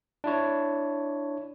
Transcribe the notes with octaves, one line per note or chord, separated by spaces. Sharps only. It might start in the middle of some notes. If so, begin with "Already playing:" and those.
D4 E4 C#5